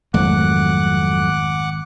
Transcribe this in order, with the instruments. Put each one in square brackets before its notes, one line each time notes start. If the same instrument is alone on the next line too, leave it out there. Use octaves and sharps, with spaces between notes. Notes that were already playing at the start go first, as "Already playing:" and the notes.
[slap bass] G#1 [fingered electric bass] F2 F#3 A3 [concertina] F#5 D6 F#6